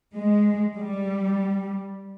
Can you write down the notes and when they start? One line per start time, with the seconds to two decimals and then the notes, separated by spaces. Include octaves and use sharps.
0.14 G#3
0.79 G3